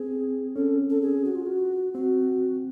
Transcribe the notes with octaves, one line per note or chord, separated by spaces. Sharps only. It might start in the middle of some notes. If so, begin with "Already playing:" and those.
Already playing: C4 G#4
C#4 A4
A4
G#4
F#4
F4
F#4
C4 F#4